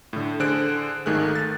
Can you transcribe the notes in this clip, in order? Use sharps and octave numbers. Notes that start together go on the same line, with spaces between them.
A2 D3
D3 G#4 C5 F#6 D7
G#1 D#3 A3 G#4 F#6
A6